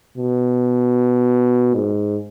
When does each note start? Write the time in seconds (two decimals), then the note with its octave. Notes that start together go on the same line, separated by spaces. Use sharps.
0.18 B2
1.75 G#2